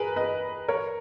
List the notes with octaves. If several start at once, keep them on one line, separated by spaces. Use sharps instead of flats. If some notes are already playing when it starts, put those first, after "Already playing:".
Already playing: G#4 A#4 B4
B4 D#5
A#4 C#5